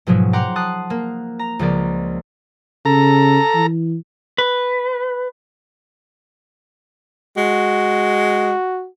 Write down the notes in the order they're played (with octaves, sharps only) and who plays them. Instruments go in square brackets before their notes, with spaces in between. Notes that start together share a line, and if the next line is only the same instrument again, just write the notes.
[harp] G#2 B2 F3 F#3 G#3
F#5 G5 A#5 C6 D6
A5 D#6 F#6 C7
A#3
A#5
C#2 F3 A#3 D5
[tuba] C#3 [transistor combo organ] A4 A#5
[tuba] E3
[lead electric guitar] B4
[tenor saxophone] G#3 [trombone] F#4